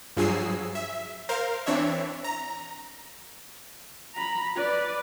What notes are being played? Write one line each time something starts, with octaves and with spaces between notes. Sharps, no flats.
G2 F3 F#3 G#4 E6 C7
E5
A#4 C5 F5
E3 C4 D4 C#5 E5
A#5
A#5 B5
B4 D5